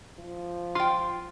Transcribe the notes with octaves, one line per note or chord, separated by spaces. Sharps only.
F3
F4 G5 C6